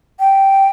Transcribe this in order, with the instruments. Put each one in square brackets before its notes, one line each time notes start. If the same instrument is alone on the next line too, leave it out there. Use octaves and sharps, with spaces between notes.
[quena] G5